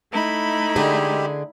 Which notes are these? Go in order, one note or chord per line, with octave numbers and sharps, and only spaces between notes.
A3 D#4 E4 B5
D3 G#3 G4 G#4